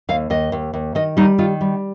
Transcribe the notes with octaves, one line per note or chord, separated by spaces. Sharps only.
D#2 F5
D#2 D#5
D#2
D#2
D#3 D#5
G3 D#4
D#3 F4
G3